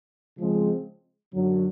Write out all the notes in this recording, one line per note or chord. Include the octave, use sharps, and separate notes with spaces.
C#3 F3 G#3 C4
F#2 D3 F#3